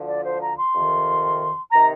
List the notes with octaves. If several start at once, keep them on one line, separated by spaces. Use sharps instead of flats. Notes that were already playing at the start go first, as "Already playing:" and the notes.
Already playing: D2 D3 F3
D5
C5
A#5
C6
F2 C3 D#3
C3 D#3 A#5